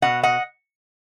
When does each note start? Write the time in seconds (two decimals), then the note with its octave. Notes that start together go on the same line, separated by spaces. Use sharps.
0.02 B2 D#5 F#5
0.23 D#5 F#5